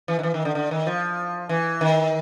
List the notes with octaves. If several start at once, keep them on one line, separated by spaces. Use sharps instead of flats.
E3
D#3
E3
D#3
D3
D3
D#3
F3
E3
D#3